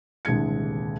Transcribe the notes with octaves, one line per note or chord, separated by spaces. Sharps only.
D#1 C2 D3 G#3 G#6 C#7